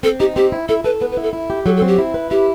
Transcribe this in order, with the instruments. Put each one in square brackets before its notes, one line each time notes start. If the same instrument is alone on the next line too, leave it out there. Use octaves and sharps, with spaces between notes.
[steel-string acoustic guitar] C4 [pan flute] A4
[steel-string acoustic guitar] D#4 [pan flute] G4
[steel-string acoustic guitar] C4 [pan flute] G4
[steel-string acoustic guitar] E4
[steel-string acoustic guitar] E4 [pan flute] A4
[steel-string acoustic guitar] A4 [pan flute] B4
[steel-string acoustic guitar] B3 [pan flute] B4
[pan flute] B4
[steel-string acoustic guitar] E4
[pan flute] A4
[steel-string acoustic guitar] E4
G4
[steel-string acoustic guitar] F#3 [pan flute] A4
[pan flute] A4
[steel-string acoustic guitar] C4
[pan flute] G4
[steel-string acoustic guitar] E4
B4
[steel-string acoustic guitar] E4 [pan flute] G4